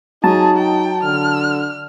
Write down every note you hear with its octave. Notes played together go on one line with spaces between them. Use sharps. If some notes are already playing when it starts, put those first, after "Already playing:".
F#3 D#4 G#4 A5
G5
D3 F6